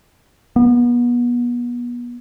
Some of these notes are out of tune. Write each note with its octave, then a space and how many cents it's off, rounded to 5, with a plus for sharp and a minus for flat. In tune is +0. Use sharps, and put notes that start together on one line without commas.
B3 -35